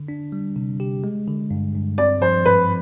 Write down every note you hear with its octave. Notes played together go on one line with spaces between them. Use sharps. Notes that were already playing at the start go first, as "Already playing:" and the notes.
Already playing: D3
D4
G3
C3
G4
G#3
D3
G2
G2
C4 D5
F3 C5
G#2 B4